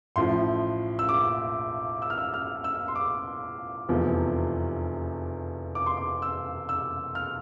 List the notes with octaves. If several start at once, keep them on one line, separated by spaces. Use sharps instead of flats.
A1 A2 F3 C6
E6
D6
E6
F6
E6
F6
E6
C6
D6
F1 E2 C3 F3
D6
C6
D6
E6
E6
F6